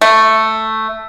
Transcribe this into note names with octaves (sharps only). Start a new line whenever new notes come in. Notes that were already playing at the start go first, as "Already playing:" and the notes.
A3